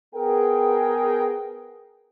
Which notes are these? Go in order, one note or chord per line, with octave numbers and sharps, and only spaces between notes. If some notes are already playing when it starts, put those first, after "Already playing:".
B3 G#4 A#4 G5